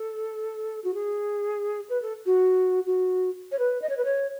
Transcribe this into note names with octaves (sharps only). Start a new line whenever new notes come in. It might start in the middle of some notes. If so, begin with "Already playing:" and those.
Already playing: A4
F#4
G#4
B4
A4
F#4
F#4
C#5
B4
D#5
C#5
B4
C#5